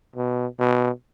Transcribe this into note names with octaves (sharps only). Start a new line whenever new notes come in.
B2
B2